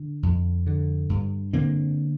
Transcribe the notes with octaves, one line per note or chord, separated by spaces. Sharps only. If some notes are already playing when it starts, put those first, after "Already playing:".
Already playing: D3
F2
D3
G2
D3 A#3 C4